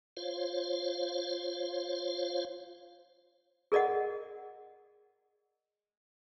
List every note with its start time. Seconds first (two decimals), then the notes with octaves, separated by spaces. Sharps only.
0.17 F4 C5 C#5 F5
3.72 G#4 A#4 D5 D#5 F#5